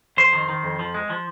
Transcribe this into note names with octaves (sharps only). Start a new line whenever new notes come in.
F2 C5
D#3
D#3
F2
F3
G#3
F3